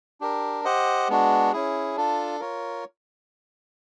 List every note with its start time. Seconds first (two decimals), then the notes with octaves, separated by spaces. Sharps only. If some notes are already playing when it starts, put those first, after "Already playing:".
0.21 D4 G4 A#4
0.65 G4 C5 D#5 F#5
1.09 G#3 B3 D4 F#4
1.52 C#4 E4 G#4
1.96 D4 F4 A4
2.40 F4 A#4 C#5